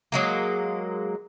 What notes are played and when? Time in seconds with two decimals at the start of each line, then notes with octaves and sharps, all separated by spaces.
0.12 F#3 G#3 A#3